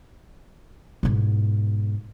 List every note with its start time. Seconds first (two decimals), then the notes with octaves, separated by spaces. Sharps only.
1.03 G#2 B2